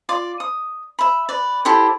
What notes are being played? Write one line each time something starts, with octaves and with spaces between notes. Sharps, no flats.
F4 D5 D6
D#6
E5 B5
B4 D5
E4 G4 A4 C5